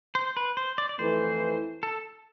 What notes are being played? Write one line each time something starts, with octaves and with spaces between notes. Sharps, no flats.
C5
B4
C5
D5
D5
F2 E3 A3 E4 B4 C5
A4